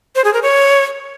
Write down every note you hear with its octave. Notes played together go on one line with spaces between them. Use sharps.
C5
G#4
A#4
C#5